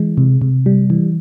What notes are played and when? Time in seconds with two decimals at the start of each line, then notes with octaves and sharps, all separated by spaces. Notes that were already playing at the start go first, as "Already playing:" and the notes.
Already playing: E3 G#3
0.18 C3
0.42 C3
0.66 G3
0.90 E3